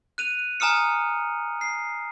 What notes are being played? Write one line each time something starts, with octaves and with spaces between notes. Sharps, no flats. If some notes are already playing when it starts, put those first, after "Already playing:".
F#6 D#7 F7
G#5 A#5 D#6 F6 C#7
C7